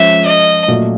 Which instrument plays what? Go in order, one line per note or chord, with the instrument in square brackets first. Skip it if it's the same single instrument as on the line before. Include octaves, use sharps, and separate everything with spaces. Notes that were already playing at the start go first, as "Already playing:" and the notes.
Already playing: [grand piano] F3 G#3 C#4 [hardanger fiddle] E5
[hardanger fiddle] D#5
[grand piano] A#2 F#3 A3